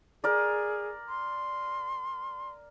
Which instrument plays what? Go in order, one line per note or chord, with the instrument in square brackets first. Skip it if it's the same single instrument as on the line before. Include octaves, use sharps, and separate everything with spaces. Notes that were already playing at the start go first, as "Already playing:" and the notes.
[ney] G#4 [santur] A#4 D5
[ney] C6